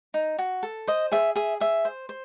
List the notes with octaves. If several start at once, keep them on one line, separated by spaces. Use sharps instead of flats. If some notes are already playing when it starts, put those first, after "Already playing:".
D#4
F#4
A4
C5 D#5
G#4 E5
G#4 E5
G#4 E5
C5
C5